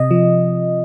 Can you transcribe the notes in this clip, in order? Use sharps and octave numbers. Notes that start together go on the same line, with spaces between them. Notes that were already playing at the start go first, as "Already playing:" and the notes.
Already playing: C3 D#5
F3